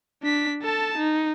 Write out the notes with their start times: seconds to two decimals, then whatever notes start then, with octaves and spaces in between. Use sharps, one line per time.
0.23 D4 B6
0.62 A4 A5
0.98 D#4